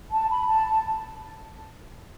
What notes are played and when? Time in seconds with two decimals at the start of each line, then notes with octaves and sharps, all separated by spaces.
0.11 A5
0.29 B5
0.47 A5